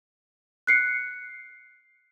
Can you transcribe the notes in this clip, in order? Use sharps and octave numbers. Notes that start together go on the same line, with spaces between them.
F#6 C7 C#7